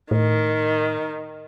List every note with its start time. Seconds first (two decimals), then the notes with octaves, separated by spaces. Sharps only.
0.11 A2 D#3